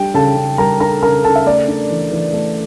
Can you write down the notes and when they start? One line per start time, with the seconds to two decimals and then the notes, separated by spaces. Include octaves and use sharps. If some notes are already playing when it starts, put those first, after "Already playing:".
Already playing: G3 D4 G4 G5
0.14 C#3 A4 A5
0.36 C#3
0.58 G3 A#4 A#5
0.80 D4 A#4 A#5
1.03 C#3 A#4 A#5
1.24 C#3 A4 A5
1.36 E5
1.46 A3 D5
1.68 D4
1.90 E3
2.12 E3
2.33 A3